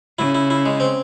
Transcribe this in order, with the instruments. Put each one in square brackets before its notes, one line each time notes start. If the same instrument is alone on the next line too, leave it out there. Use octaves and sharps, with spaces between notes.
[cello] C#3 [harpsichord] E4
[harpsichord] E4
E4
G#3
C4